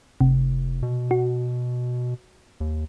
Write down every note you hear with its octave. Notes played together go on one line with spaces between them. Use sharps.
F1 C3
B2
F#4
D#2